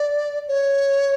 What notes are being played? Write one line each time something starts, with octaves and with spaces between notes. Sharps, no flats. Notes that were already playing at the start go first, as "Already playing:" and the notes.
Already playing: D5
C#5